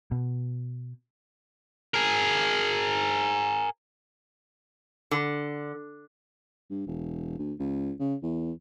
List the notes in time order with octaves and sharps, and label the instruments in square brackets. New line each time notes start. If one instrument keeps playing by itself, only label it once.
[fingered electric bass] B2
[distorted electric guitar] G#4 A#4
[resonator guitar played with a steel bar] D3
[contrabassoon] G2
E1
D2
C#2
C#3
E2